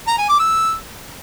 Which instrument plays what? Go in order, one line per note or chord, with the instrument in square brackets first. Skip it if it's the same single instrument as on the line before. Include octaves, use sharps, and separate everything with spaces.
[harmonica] A#5
G#5
D6
E6